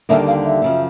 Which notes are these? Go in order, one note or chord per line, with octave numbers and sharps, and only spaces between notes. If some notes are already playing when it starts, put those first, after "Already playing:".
D#2 D3 G3 A#3 D#4 E5
F5
E5
F#2 C#3 F3